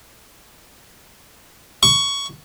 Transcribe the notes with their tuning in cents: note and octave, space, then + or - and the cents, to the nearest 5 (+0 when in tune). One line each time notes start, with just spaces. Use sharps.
C#6 +10